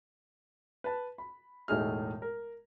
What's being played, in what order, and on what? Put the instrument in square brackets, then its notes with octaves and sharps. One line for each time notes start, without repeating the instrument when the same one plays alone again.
[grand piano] B4 A5
B5
E1 A2 A3 D#4 G#4 F6
A#4